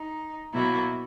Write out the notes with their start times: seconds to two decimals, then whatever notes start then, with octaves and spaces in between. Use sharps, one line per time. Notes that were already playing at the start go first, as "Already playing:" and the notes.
Already playing: D#4
0.53 B2 F#3 A#3 E4